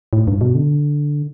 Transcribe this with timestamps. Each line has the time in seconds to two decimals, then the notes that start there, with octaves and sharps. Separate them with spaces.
0.13 A2
0.28 G2
0.41 B2
0.55 D3